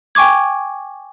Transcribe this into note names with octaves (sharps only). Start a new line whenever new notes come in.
G5 G#5 C#6 D6 G#6